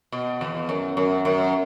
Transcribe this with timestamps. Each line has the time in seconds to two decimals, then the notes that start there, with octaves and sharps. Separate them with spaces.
0.12 B2
0.41 E2
0.69 F#2
0.97 F#2
1.25 F#2